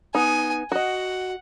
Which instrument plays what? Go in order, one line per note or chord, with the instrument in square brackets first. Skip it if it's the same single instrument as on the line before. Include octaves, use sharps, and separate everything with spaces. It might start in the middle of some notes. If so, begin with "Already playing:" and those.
[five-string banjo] B3 D#4 [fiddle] G#5
[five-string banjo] F#4 D#5 [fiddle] F#5